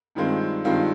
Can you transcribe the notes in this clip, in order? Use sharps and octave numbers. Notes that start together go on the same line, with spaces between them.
G2 D#3 G#3 C4 F4
G2 D#3 G#3 C4 F4